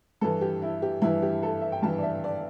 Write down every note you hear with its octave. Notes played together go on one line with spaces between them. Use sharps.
G2 E3 A4
G4
E4
G4
G2 E3 E4
G4
A4
E5
G5
G2 E3 A5
D5
E5
D5